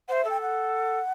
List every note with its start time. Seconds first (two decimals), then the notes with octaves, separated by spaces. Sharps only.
0.08 C5 E5 F#5
0.24 A4
0.30 G5
0.41 F#5